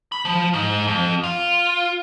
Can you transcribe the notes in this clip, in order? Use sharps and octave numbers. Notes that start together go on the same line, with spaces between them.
B5
F3
G#2
F2
F4